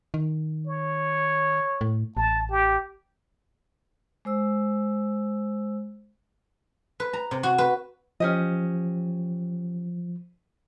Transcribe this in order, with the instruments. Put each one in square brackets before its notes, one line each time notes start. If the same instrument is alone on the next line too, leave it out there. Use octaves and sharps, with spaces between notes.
[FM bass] D#3
[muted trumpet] C#5
[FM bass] A2
[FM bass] A1 [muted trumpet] A5
[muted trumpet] G4
[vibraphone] G#3 C5 E6
[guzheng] B4
A#5
C3
F#4
B4
[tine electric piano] F3 [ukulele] C#4 G4 D#5